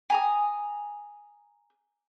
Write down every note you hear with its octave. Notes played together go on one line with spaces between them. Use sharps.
G#5 A#5 D#6